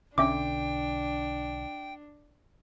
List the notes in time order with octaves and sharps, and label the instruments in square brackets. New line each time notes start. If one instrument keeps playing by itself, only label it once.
[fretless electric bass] B1 D3 [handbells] C#4 E5 D6 [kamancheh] D4 [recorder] G5